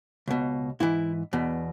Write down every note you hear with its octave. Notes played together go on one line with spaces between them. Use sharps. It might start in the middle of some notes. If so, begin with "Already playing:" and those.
C#2 B2
G#2 E3 E4
E2 B2